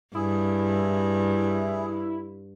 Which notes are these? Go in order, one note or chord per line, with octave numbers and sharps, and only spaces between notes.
G2 E4 G#4